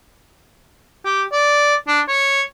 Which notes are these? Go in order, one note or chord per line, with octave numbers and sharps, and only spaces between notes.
G4
D5
D4
C#5